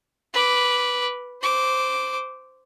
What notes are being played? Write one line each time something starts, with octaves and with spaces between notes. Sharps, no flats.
B4 D6
C5 D6